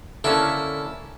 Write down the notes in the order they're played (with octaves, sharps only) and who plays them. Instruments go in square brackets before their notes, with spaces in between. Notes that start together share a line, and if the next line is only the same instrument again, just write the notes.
[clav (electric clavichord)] D3 A#3 C#4 [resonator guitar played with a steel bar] E4 [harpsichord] A4